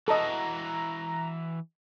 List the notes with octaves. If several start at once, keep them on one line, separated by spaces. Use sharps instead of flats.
E3 F#4 A4 D#5 A#5